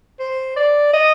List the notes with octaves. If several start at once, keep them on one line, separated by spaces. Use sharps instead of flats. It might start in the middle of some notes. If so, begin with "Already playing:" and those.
C5
D5
D#5